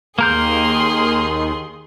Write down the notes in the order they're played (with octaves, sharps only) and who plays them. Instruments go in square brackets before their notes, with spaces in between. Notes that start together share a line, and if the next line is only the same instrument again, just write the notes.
[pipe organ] D#2 D#3 [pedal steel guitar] A#3 A#4 G6 [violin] G#4 C6